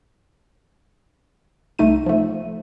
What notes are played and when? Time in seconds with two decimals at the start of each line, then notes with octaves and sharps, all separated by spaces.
1.79 C2 A3 D#4 D#7
2.06 F3 A3